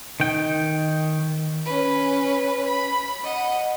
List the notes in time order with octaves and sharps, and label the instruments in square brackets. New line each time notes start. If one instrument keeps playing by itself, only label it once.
[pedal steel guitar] D#3 G5
[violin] C#4 B4
B5
D#5 F#5